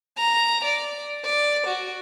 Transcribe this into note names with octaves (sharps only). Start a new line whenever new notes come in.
A#5
D5
D5
F#4